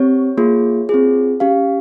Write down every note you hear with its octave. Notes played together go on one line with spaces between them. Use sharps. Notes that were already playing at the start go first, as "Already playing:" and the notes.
Already playing: C4 G4 C#5
A#3 F4 G#4
C4 F4 G#4
C#4 G4 F5